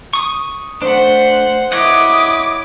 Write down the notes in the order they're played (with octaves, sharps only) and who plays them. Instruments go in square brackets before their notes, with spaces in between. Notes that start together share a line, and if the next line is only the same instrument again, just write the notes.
[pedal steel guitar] C#6 D#6
[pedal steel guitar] A3 D4 [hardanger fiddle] C5 F#5
[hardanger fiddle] E4 [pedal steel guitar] C#5 D#5 F#5 [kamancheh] D6 D#6